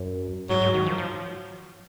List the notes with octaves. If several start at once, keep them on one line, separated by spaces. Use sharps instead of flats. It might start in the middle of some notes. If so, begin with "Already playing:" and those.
Already playing: F#2
G#2 F#3
G#2
D#3
F3
F3